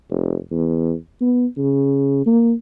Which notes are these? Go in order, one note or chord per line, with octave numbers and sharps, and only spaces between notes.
F1
E2
B3
C#3
A#3